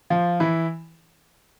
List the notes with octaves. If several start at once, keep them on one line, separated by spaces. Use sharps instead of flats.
F3 F4
E3 E4